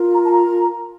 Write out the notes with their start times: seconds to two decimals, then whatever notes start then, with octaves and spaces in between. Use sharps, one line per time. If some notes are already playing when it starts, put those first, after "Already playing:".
Already playing: F4 A#4
0.13 A#5
0.25 A5
0.32 A#5